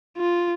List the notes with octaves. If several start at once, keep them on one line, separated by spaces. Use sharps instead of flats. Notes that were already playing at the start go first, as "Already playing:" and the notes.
F4